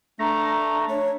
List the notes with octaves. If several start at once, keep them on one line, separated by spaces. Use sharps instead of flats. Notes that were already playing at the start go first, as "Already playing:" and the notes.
A3 D4 A#5
C#5